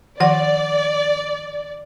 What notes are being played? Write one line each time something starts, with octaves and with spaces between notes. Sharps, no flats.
D#3 F3 D5 F#5